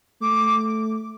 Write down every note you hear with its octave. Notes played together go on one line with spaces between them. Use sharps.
A3 D6